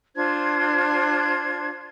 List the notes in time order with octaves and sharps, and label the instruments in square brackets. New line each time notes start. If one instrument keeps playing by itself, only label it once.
[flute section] D4 F4 C5 G#6